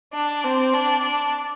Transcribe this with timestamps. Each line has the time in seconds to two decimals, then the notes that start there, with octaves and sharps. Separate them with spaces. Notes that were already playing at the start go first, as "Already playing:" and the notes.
0.14 D4
0.44 C4
0.74 D4
1.04 D4